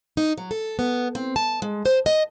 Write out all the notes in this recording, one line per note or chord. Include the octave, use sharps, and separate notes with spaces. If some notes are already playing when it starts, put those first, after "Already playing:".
D#4
F#3
A4
B3
C4
A5
G#3
C5
D#5